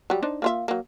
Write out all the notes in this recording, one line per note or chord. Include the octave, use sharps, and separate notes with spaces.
F#3 G3
D4 D#4 C5
A#3 F4 E5
F#3 A#3